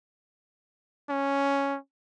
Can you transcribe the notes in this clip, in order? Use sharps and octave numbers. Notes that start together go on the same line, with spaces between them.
C#4